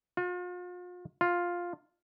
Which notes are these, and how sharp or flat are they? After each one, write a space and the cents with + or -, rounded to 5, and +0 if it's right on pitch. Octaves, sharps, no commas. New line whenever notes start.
F4 +40
F4 +5